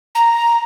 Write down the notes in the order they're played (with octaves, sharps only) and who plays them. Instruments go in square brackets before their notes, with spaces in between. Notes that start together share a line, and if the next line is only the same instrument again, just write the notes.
[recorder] A#5